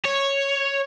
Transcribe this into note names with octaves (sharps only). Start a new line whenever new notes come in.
C#5